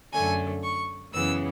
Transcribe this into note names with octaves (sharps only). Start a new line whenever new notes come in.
F#2 D3 A3 G#5
C#6
F#2 C#3 E3 B3 E6